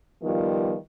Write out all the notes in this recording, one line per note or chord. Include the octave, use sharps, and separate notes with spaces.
D#3 F3 G3 B3 F4